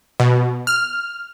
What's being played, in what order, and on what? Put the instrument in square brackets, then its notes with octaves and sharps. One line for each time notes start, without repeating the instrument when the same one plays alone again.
[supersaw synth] B2
F6